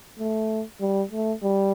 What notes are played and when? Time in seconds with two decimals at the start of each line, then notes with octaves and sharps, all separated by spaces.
0.20 A3
0.81 G3
1.11 A3
1.43 G3